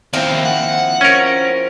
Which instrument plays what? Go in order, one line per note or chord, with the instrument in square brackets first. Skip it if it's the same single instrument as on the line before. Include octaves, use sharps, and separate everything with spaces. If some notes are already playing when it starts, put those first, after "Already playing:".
[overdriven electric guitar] D#3 A#3 [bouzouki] F3 C4 E4
[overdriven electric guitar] F#5
[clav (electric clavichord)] C#4 A#4